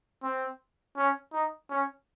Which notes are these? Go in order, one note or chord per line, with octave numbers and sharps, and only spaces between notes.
C4
C#4
D#4
C#4